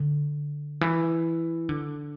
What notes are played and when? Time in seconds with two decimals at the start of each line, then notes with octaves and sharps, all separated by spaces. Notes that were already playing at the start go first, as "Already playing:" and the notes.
Already playing: D3
0.81 E3
1.69 D3